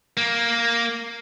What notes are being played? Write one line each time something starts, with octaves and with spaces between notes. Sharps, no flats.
A#3